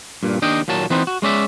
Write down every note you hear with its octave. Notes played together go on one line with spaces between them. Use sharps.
G2 A#2
D#2 D4 D#5 G5
D#2 A#2 F#3 A5
E3 B3 C4 D#4 C5
F#4
G#3 C#4 D5 E5